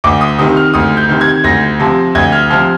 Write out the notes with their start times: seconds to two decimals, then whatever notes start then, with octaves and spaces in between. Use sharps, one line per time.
0.04 D2 D6
0.21 D#6
0.39 C3 D#3 D#6
0.57 F6
0.74 D2 D#6
0.97 G6
1.09 C3 D#3
1.21 G#6
1.44 D2 A#6
1.80 C3 F3
2.15 D2 G#6
2.32 F6
2.50 C3 F3 F6